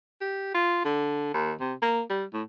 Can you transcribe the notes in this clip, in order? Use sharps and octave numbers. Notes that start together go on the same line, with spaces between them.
G4
F4
D3
D#2
C3
A#3
G3
A2